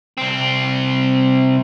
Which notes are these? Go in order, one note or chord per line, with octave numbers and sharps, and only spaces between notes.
C2 C4